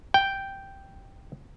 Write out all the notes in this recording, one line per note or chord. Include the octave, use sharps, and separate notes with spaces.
G5